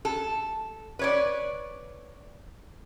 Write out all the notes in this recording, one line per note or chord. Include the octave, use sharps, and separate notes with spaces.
A4
B4 C#5 D5